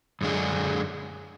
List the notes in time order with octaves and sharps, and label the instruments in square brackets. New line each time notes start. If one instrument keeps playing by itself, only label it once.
[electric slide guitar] F#2 D3 G#3 D4 G#4